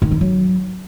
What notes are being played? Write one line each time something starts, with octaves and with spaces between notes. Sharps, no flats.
D#3
D#4
F#3